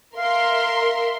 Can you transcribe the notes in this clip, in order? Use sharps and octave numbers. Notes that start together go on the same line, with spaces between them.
A#4 E5 F5 C6